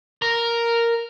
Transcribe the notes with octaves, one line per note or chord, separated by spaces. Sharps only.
A#4